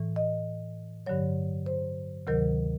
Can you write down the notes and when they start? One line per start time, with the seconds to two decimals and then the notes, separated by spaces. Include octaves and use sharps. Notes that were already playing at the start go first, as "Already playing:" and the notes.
Already playing: A2 E3
0.16 D#5
1.06 G2 D3 F#3 C#5
1.66 C5
2.27 D2 C3 D#3 F#3 A#4